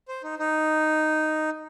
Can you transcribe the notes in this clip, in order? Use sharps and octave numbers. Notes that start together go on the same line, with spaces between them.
C5
D#4
D#4